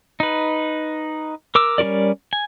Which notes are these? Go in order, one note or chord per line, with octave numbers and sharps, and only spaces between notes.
D#4 B4
A#4 D6 E6
G3 C#4 F#4 A#4 D5
G#5